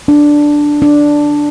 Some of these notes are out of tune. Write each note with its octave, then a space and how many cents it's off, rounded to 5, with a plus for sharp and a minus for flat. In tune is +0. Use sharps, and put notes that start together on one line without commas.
D4 +0
D4 +0